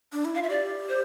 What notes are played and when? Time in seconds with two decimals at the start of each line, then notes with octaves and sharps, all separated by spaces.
0.13 D4
0.25 E4
0.35 F5
0.38 F4 E5
0.50 G4 D5
0.89 C5